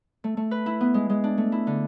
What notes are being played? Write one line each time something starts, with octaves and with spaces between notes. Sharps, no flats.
A3
A3
B4
E4
B3
G#3
G#3
D4
A3
E4
D3